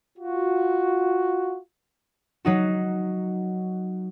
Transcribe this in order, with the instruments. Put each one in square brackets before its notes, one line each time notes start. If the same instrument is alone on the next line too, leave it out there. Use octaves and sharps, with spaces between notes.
[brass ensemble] F4 F#4
[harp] F#3 D#4 F#4